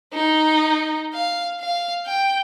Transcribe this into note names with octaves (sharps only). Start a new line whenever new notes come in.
D#4
F5
F5
G5